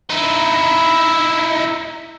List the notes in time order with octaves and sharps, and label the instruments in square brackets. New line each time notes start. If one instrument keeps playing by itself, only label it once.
[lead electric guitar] D#4 E4